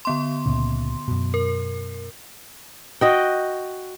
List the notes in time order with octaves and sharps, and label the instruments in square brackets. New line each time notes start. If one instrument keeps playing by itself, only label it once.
[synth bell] D3 B3 C6
[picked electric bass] C#2 A#2 C#3
F#2 B2
[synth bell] A#4
[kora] F#4 D#5 G5